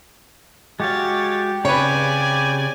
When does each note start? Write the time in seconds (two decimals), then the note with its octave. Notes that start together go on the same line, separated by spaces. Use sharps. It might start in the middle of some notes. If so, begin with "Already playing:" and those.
0.80 G#3 F#4 G4 C#5 F5 A6
1.65 C#3 C4 B4 C#5 D5 G#5